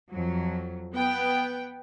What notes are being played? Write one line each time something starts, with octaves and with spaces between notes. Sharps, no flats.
F2 F#3
B3 G5